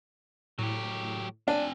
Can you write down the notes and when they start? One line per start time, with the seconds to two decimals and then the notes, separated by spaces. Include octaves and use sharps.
0.59 A2 F#3 G4
1.48 C4 D4 G#5